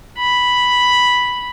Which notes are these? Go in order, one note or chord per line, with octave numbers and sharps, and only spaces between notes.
B5